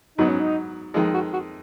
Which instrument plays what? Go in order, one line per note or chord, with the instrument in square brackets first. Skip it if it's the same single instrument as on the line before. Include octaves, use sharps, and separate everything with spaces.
[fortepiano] G#2 F#3 B3 [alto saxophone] D#4
[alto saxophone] C#4
D#4
[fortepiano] F2 D#3 G#3 [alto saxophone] F4
[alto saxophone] F#4
F#4